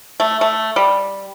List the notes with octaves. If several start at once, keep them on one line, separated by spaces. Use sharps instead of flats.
A3
A3
G3